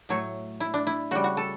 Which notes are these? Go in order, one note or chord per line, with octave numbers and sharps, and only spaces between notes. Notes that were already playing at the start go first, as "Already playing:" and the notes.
A2 F#3 A3 C#5
E4
D4
E4
C#3 G3 F#4
F#4
A4